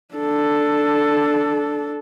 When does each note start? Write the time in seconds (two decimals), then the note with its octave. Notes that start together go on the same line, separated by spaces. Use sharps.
0.15 D4 A4